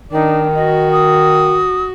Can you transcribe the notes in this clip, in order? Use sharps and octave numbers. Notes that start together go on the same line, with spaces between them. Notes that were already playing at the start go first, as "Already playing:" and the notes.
D#3 D4 D#4
F#4 D#5
D#6